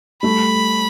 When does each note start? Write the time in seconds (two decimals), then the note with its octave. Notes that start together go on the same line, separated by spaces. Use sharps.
0.23 G3 A3 B5